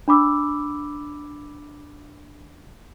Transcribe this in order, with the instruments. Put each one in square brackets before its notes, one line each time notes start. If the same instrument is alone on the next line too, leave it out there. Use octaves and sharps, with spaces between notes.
[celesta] D4 B5 D6 E6